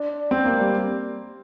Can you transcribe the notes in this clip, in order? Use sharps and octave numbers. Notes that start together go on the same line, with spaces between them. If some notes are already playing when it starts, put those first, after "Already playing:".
Already playing: D4
C4
A#3
G3